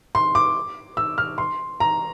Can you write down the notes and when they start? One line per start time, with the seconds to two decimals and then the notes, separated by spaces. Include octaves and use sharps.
0.15 C6
0.35 D6
0.97 E6
1.18 F6
1.38 C6
1.80 A#5